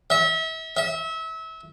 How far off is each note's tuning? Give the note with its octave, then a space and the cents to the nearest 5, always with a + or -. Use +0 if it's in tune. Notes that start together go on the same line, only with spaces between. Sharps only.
E5 -35
E5 -30